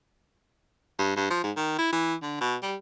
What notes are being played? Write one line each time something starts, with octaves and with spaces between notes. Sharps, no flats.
G2
G2
F3
G#2
D#3
E4
E3
D3
B2
G3